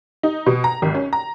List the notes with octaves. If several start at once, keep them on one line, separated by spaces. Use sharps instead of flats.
D#4
B2
A#5
G#1
C#4
A#5